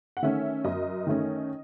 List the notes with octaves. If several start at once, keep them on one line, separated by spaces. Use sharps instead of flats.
F#5
D#3 A3 C#4 E5
F#2 D#5
D#3 A3 C#4